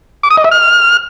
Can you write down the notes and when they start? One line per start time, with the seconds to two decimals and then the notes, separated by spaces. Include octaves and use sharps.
0.23 D6
0.30 D#6
0.37 D#5
0.44 E5
0.51 F6